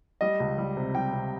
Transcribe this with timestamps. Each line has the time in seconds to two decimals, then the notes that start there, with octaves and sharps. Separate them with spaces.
0.21 G3 D#5
0.40 C#2
0.58 G3
0.77 C3
0.95 G3 G5
1.13 C3